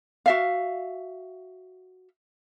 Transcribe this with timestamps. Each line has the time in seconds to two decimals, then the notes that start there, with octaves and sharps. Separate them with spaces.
0.26 F#4 E5 F5